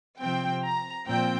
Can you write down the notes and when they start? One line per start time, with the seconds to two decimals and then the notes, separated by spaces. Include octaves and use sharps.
0.21 C3 F3 C4 G5
0.64 A#5
1.06 A#2 F3 C4 G5